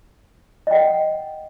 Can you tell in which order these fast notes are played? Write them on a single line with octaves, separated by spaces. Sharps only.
D#5 G5 F#5